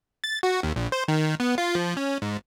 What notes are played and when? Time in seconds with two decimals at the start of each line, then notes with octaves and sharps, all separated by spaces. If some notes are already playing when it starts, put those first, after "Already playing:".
0.24 A6
0.43 F#4
0.63 D#2
0.76 A#1
0.92 C5
1.08 D#3
1.40 B3
1.58 F4
1.75 F3
1.97 C#4
2.22 G#2